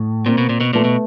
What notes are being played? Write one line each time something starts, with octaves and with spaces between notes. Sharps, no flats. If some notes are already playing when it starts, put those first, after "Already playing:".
Already playing: A2
A#2 A#3 C4
B2
A#2
B2
A#2 A3 B3
B2